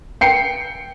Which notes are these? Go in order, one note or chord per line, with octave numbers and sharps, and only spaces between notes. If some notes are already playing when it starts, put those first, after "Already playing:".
G5 C7 C#7